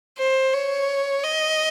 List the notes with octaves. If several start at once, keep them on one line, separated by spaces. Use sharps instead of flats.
C5
C#5
D#5